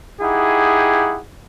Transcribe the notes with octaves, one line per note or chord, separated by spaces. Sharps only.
D#4 E4 G4 G#4 F#5